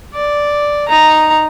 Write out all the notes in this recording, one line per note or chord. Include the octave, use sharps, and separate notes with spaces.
D5
D#4 A#5